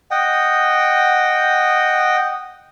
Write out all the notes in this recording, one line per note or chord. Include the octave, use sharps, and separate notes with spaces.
D#5 F#5 G5